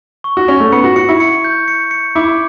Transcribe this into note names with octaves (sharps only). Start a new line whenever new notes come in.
C#6
F#4
C#4 C#6
A3
B3 C#7
F#4
F#4 C#7
E4
C#7
G6
C#7
C#7
E4 D6